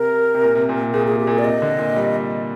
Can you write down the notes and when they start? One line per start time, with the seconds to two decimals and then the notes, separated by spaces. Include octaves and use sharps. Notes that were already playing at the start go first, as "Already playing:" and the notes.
Already playing: C3 A#4
0.35 C3
0.43 A#2
0.55 C3
0.69 A#2
0.81 C3
0.93 A#2 G#4
1.07 C3 G#4
1.19 G4
1.27 A#2
1.32 G#4
1.39 D5
1.44 C3 D#5
1.62 D3
1.78 A#2
1.96 G3